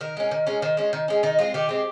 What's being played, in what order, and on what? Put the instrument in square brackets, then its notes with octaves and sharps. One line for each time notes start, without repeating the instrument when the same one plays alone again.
[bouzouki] D#3 A#4
G#3 C#4
D#3
G#3 C#4
D#3 C5
G#3 C#4
D#3
G#3 C#4
D#3 D#4
G#3 C4 F4
D#3 G4
G#3 C4